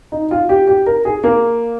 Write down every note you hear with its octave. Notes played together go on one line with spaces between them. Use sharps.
D#4
F4
G4
G4
A#4
G#4
A#3